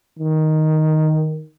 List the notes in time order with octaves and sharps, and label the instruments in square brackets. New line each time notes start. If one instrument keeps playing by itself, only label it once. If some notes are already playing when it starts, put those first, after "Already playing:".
[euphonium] D#3